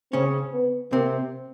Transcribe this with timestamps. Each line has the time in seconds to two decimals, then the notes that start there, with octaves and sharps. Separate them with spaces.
0.13 C#3 C4 C#4
0.53 B3
0.92 C3 A#3 C4